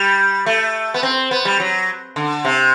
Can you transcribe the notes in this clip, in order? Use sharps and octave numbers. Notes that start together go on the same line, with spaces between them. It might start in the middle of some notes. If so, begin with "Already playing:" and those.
Already playing: G3
A3
B3
C4
B3
G3
F#3
D3
C3